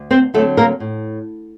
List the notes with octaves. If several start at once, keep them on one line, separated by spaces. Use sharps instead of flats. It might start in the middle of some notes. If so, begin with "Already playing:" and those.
Already playing: D2
C4 C5
D3 F#3 A3 C4 A4
A#3 A#4
A2